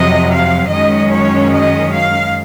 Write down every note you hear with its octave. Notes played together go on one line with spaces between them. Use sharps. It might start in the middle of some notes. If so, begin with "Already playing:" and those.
Already playing: F2 C3 F#3 D#5
F5
F#2 D#3 G#3 C#4 D#5
C#5
D#5
F5